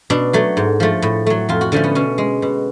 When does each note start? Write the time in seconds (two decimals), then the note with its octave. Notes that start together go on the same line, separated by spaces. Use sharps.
0.10 B2 D4
0.33 F#3 A3
0.57 G#2
0.80 F3 A3
1.02 A2
1.26 F#3 A3
1.49 F2 F4
1.61 F#4
1.72 D3 F3 A3 C#4
1.84 B3
1.95 B2 C#4
2.18 G#3
2.42 B2